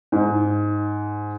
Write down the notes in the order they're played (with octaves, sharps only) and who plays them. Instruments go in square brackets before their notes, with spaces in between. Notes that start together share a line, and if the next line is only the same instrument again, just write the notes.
[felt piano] G#2